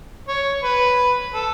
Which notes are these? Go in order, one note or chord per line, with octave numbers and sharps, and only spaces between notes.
C#5
B4
A4